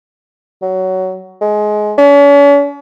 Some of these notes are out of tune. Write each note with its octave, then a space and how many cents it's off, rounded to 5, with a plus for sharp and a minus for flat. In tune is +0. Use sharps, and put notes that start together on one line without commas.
F#3 +15
G#3 +20
C#4 +45